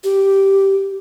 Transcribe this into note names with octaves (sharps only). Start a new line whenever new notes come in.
G4